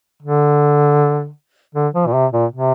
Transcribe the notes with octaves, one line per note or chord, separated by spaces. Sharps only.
D3
D3
F3
A#2
C3
A#2
C3